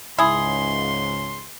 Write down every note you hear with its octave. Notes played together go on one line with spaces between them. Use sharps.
C#2 G#2 C#3 E4 G#4 C6